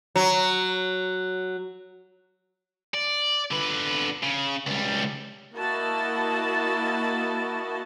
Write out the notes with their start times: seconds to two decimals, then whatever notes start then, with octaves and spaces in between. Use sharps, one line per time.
0.16 F#3
2.94 D5
3.51 D3 B4
4.23 C#3
4.66 C#2 G3
5.55 A#3 E4 F#4 D#5 A5